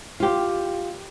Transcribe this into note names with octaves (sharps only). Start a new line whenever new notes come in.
F4 G4